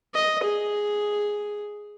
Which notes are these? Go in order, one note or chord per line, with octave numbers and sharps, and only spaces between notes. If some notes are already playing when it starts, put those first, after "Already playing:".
D#5
G#4